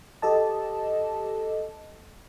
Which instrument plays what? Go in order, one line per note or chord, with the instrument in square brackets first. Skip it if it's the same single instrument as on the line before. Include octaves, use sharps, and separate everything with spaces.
[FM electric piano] G4 A4 D#5 A5